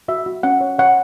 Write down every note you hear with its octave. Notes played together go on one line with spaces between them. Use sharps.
F#4 E5
F#4
C#4 F#5
C#5
C#5 F#5